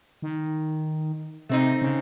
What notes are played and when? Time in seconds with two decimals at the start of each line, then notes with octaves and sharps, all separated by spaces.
0.22 D#3
1.49 C3 A3 C4 D#4
1.82 C#3